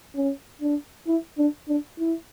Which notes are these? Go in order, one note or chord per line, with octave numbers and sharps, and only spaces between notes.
C#4
D4
E4
D4
D4
E4